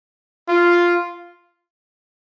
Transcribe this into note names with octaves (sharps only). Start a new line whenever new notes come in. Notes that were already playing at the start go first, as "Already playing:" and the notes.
F4